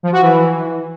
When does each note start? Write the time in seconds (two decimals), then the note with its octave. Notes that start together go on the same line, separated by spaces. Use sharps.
0.03 F3
0.12 F#4
0.21 E3